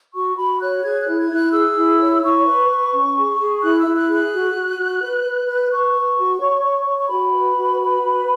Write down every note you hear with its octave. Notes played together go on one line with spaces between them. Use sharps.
F#4 C#6
F#4 B5
C#5 F#6
G#4 G#6
E4 F#6
G#6
E4
F#6
G#4 E6
E4
C#5
E4 C#6
B4
B4
C#4
G#4
G#4
E4 F#6
E6
E4
F#6
G#4
F#6
F#4
F#4
F#4
B4
B4
B4
B4 C#6
B4
F#4
C#5
C#5
C#5
C#6
F#4 B5
B4
F#4
B4
F#4